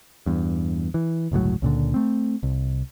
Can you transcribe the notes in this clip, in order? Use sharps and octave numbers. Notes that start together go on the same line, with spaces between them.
E2 G2
E3
G1 C#2 A2 F#3
C#2 A#2 D3
A3 C4
C2